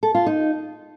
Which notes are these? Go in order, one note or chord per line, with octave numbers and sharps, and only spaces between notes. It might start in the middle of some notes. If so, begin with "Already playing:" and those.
A4
F4
D#4